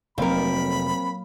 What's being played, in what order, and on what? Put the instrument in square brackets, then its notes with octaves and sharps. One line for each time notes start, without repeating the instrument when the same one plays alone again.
[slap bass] F1 [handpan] F#3 A#3 F5 [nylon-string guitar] C4 A#4 [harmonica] B5